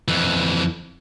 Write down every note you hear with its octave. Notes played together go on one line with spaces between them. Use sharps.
F2 E3